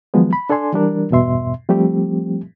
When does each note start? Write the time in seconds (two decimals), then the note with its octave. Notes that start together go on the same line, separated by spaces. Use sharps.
0.14 D#3 F3 F#3 G#3 B3
0.33 B5
0.50 D4 A4 D5 G#5 C6
0.73 E3 G3 D4 A#4
1.10 E2 G2 B2 E5 C6
1.69 F3 G3 A3 C4 G4